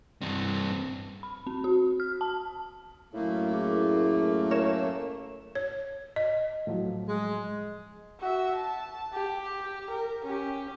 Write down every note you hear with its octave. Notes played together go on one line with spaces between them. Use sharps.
G2 C4
B5
C4
F#4
F6
A5
F#2 A2 A3 A#3
E4 G#4 D6
A4 A#4 C#5 E7
C#5
D#5
A2 F3 F#3
G#3
F#4 E5
A5
G4
A#4
C#4 G4